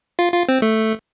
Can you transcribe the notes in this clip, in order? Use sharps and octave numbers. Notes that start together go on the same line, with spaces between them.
F4
F4
C4
A3